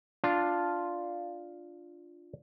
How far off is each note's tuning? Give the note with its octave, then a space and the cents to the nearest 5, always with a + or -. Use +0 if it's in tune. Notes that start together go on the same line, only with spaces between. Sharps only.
D4 +0 F4 +0